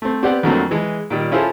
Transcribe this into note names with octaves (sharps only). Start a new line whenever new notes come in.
A3 C4
B3 C4 G4 C5 D5 F#5
F2 D3 F#3 A3 A#3 C4
E3 G#3
A#2 D#3 G3
C#4 E4 F4 G#4 A4 C5